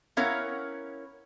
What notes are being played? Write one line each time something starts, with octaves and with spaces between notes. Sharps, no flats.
B3 C#4 E4 A#4 C#5 F5